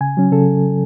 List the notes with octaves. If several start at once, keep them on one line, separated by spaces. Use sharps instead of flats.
C#3 G#5
F#3 C#4
C#3 A4